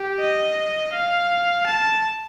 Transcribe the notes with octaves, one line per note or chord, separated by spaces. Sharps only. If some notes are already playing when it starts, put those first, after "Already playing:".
Already playing: G4
D#5
F5
A5